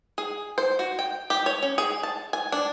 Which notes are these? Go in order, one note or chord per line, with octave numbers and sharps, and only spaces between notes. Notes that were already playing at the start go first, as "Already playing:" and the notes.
G#4
C5
F#4
G5
G4
C#5
C#4
G#4
A5
G#5
D4